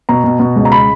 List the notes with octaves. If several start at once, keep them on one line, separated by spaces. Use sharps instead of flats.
B2 A#5
B2
B2
C#2
A#5
B5